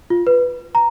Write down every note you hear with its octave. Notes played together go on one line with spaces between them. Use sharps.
F4
B4
A#5